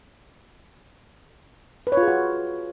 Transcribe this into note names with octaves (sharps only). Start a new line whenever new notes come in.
B4
C#5
F4
G#4
F#4